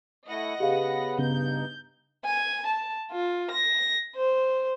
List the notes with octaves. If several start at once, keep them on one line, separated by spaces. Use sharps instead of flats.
A3 E4 D#5 F#5 A#6
C#3 B3 G4 G#4 B4 F5
G2 C#3 B3 D#4 G6
G#5
A5
F4
A#6
C5